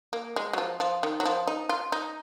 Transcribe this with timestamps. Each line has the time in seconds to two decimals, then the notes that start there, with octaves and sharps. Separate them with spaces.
0.13 A#3
0.36 G#3
0.53 F#3
0.58 F3
0.80 F3
1.03 D#3
1.20 F#3
1.26 F3
1.47 D#4
1.69 F4
1.92 D#4